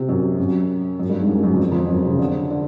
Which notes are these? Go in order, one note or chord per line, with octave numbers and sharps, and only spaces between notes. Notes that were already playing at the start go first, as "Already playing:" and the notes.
Already playing: C3
F#2
F#2
F#2
G2
G#2
F#2
F#2
F2
F2
F#2
C3
C#3
D3
D3